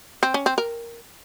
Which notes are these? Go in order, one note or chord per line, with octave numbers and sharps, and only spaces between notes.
C4
C#4
C4
A#4